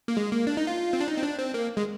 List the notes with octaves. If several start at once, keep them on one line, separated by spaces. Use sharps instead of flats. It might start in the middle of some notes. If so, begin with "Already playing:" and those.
A#3
G#3
A#3
D4
D#4
F4
C4
D4
D#4
C4
D4
C4
A#3
G#3